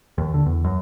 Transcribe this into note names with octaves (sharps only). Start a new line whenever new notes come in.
D#2
D3
E2
F#2